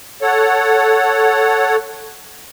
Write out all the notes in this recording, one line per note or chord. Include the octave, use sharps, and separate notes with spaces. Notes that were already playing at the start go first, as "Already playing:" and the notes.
A4 C#5 F#5